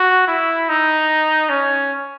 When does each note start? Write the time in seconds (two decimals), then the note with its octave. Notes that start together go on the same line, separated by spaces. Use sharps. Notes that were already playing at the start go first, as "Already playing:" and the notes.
Already playing: F#4
0.28 E4
0.69 D#4
1.50 C#4